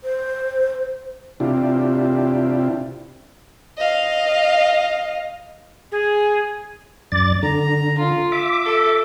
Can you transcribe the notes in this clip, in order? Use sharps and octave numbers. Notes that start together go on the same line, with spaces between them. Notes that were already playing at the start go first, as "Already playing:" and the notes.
C5
C3 D4 E4 F4 G4
D#5 F5
G#4
F#2 D5 A6
D3 A#5
F4
E5 D6
A4